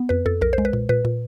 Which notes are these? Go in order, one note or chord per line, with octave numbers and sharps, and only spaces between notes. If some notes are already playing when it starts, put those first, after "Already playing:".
Already playing: B3
F2 B4
F2 A4
B1 A#4
C5
G#3
B4
A#2
A#2 B4
A#2